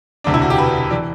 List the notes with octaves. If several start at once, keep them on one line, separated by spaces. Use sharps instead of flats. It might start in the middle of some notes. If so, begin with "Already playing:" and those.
E1 D2 C3 D4
E4
F#4
G4
B4
E3 D5